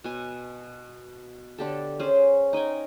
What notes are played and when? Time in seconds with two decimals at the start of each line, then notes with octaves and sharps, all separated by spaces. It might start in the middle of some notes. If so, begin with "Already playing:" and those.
0.04 B2 G#5
1.58 D3 G4 A4
1.99 C#4 G#4 C5
2.53 D#4 D#5 G5 G#5